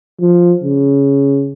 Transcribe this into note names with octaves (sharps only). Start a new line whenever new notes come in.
F3
C#3